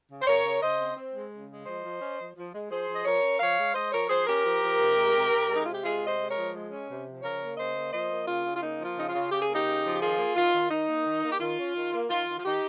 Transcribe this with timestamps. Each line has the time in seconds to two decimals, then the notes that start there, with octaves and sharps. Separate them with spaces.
0.10 C#3
0.22 C5
0.27 C#3 A#4 C#5
0.45 C#3
0.62 C#3 C5 D#5
0.80 C4
0.97 C4
1.14 G#3
1.32 C#3
1.49 G#3
1.66 F3 C5 D#5
1.84 F3
2.01 C#4
2.19 F3
2.36 F3
2.53 G#3
2.70 F3 G#4 C5
2.88 F3
2.96 D#5
3.05 F3 A#4 C#5
3.23 C#4
3.40 F3 C#5 F5
3.58 G#3
3.75 G#3 C5 D#5
3.92 F3 A#4 C#5
4.10 F3 G#4 C5
4.27 C#4 G4 A#4
4.45 F3
4.63 F3
4.79 C3
4.97 G#3
5.14 C3
5.32 C3
5.49 G#3
5.55 D#4
5.65 C3 F4
5.74 G4
5.83 G#3 F4 G#4
6.02 C3
6.07 C5 D#5
6.19 G#3
6.30 A#4 C#5
6.36 F3
6.53 G#3
6.70 C#4
6.88 C3
7.06 F3
7.23 C#3 A#4 C#5
7.40 A#3
7.57 C#3 C5 D#5
7.75 A#3
7.93 F3 C5 D#5
8.10 A#3
8.28 C#3 F4
8.45 C#3
8.55 F4
8.61 A#3 D#4
8.79 F3
8.85 F4
8.97 C#3 D#4
9.08 F4
9.14 C#3
9.31 C#3 G4
9.42 G#4
9.48 A#3
9.54 D#4 G4
9.66 C#3
9.84 F3
9.96 G4
10.01 D#3 F4 G#4
10.18 A#3
10.37 D#3 F4
10.54 D#3
10.70 D#3 D#4
10.88 A#3
11.05 D#3
11.23 A#3
11.31 G4
11.40 D#3 F4
11.58 C#4
11.75 D#3
11.93 A#3
12.09 D#3 F4
12.28 D#3
12.39 F4
12.45 D#3 D#4 G4